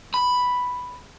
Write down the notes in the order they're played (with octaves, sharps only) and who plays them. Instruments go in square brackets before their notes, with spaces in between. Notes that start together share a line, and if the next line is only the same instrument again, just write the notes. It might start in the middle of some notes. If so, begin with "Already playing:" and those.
[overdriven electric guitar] B5